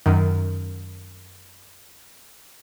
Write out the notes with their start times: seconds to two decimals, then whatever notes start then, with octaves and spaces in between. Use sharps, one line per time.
0.06 F#2 D#3